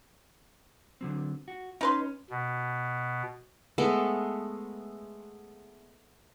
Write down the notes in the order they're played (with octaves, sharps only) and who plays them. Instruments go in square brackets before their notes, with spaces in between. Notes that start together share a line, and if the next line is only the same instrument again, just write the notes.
[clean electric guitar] D3 F#3 C4
F#4
[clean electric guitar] C#4 [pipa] D#4 B4 C6
[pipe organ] B2
[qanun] G#3 A3 B3